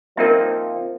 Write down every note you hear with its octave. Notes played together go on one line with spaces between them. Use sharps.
F3 A#3 C4 D#4 A#4 E5